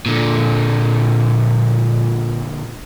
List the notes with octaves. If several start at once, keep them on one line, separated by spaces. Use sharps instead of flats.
A#2 D3